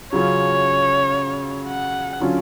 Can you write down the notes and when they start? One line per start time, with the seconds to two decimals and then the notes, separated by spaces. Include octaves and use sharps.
0.13 C#3 F#3 C#4 F4 C#5
1.69 F#5
2.20 D3 F#3 C#4 F4